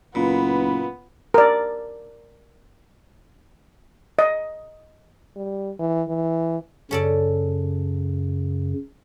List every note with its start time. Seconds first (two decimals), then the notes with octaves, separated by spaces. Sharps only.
0.15 F#1 A#2 B3 B4
1.34 A#4 D5
4.19 D#5
5.36 G3
5.79 E3
6.08 E3
6.91 F#2 C#3 C#4 A4 D5